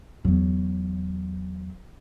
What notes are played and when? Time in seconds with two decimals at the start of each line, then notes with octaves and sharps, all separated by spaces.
0.25 E2 F#3